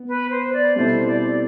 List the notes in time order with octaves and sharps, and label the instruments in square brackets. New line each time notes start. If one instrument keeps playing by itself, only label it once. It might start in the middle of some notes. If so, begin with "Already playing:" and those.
Already playing: [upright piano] B3
[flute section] B4
C5
D5
[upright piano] B2 G3 C4 E4 A4 [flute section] C5
[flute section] D5